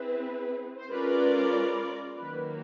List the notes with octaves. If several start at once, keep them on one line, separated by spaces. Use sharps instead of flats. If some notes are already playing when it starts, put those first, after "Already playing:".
Already playing: C4 E4 G#4 B4
C5
G#3 C#4 F4 A#4 B4 D5
D#3 F#3 A#3 B4